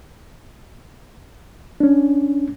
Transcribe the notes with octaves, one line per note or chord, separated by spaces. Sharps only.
C#4 D4